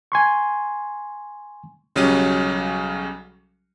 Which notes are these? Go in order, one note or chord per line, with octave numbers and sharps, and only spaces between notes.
G#5 C6 C#6
B1 C#3 F#3 G3 C#4 D#7